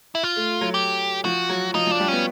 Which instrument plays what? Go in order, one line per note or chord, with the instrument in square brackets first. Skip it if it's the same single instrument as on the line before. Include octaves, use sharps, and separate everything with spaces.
[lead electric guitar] E4
F4
[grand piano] A3
F#3
[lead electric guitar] G4
[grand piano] F3 [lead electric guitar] F#4
[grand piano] F#3
[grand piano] F3 [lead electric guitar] D#4
[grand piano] F3
[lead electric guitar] D4
[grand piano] G3
[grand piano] B3 [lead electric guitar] C#4